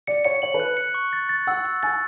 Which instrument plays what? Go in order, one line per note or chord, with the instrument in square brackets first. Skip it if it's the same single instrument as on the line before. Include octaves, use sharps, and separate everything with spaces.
[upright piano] D5 [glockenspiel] C#7
[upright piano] C#5 [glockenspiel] C#7
[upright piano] C#5 [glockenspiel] F#7
[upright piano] B4
[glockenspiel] F#6
C#7
C#6
A6
A6
[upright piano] F#5 [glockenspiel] E6
[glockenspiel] A6
[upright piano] G#5 [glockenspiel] A6